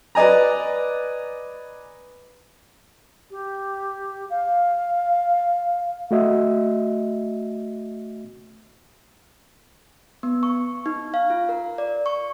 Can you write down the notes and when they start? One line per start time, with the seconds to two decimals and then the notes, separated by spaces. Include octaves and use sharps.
0.15 B4 D5 D#5 G#5 A#5
3.31 G4
4.30 F5
6.11 A3 F#4 D#5 E5
10.23 B3
10.43 C#6
10.86 D#4
11.14 F5
11.30 F4
11.49 A#4
11.78 D5
12.06 C#6